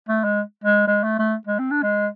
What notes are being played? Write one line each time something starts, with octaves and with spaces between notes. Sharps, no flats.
A3
G#3
G#3
G#3
A3
A3
G#3
C4
D4
G#3